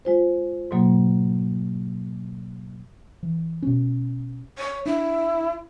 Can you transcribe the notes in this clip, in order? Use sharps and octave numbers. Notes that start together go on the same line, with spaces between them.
G#3 F4 C5
G#2 B2 F#3 A#3
E3
B2 C#4
C#5
D4 E4